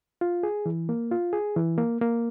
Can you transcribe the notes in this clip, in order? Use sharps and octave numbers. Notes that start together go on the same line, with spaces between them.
F4
G#4
E3
A#3
F4
G#4
E3
A#3
A#3